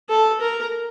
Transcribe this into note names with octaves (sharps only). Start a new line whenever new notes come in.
A4
A#4